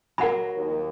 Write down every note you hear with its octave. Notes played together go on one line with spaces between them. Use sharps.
F#3 A#4 F#5 B5
D#2